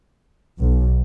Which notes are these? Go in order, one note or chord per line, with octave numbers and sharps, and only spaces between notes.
B1